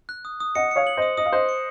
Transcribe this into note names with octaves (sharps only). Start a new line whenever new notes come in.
F#6
D#6
D#6
D#5 F#5 C#7
C#5 F5 C#7
F#7
C5 D#5 D#6
D#5 D#6
F5
C5 D#5 F#6
C#7